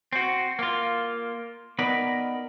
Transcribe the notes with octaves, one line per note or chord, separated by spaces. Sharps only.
C4 F#4
A#3 F4
B3 D#4 A#4 B4 D5